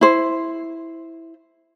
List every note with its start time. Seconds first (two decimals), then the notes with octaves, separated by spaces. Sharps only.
0.01 E4 C5